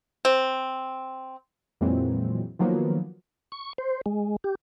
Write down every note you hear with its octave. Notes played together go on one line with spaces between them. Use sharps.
C4
F2 A#2 E3 F#3 G#3 C4
D#3 F3 F#3 A#3 B3
C#6
C5
G#3
G4